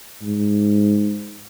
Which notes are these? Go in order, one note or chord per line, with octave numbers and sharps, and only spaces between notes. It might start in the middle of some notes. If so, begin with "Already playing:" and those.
G#2